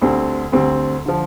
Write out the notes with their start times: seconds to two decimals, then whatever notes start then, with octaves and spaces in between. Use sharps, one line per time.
0.01 D2 D3 G3 C4
0.52 D2 D3 G3 C4
1.06 D3 F3